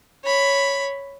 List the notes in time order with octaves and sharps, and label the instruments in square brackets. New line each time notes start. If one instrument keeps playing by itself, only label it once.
[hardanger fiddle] C#5 B5